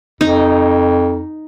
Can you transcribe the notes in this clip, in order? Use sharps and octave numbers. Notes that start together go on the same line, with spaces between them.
F2 D#4